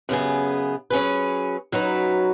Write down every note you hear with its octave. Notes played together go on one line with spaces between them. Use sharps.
F#2 C#3 B3 G#4
F#3 C#4 G#4 B4
F#2 F#3 D#4 F#4 B4